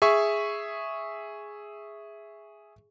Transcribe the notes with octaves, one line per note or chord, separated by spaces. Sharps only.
G#4 E5 C#6